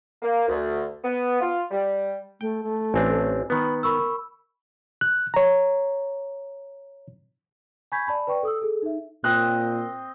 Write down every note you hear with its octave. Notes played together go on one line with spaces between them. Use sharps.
A#3
D2
B3
F4
G3
A3 G5
A3
A1 C4 D4 G#5
D#3 B3 B4 B5
A#4 B5 C#6 E6
F#6
C#5 A#5
G#5 B5 C#6 G6 G#6 B6
D5 A5 B5
B4 D5 G5 C#6
A4 D#6 E6
G#4 A4
D#4 E5
A#2 C4 D#5 C6 F#6